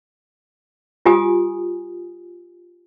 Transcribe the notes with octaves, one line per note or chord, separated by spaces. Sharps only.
F4 G4 G#5 D#6